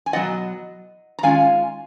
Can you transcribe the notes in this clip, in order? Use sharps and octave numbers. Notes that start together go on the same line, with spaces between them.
G#5
B2 F#3 B3 F4 D#5 F#5
A#5
D#3 G#3 C#4 F4 F5 G#5